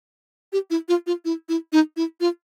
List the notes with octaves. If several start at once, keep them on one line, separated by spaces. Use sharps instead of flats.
G4
E4
F4
F4
E4
E4
D#4
E4
F4